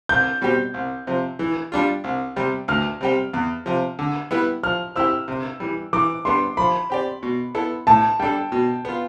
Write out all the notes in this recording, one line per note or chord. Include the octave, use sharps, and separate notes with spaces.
C2 G6
B2 G3 C4 G4
C2
C3 F3
E3
G3 D4 F4
C2
C3 G3
D2 F6
C3 G3 C4 G4
E2
C3 F3
D3
G3 B3 E4 B4
F3 F6
C4 E4 G4 E6
C3
E3 G3
E3 D6
G3 B3 D4 C6
F3 B5
C4 G4 D5
B2
B3 E4 A4
A2 A5
G3 D4 A4 G5
B2
B3 F4